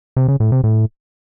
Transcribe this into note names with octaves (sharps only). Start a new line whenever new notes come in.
C3
C#3
A2
C3
A2